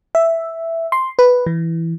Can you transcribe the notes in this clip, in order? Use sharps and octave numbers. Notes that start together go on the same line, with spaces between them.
E5
C6
B4
E3